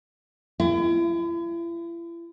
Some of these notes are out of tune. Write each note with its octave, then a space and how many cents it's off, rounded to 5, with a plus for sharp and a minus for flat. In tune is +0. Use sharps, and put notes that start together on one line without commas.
E4 +40